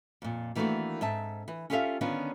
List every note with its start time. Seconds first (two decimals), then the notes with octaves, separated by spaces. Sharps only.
0.22 F2 A#2
0.55 D#3 E3 A3 A#3 D4 F#4
1.01 G#2 C4 E5 A5
1.48 E3
1.70 C#4 F4 G4 A4 E5 F5
2.01 D3 D#3 B3 C#4 D4 F4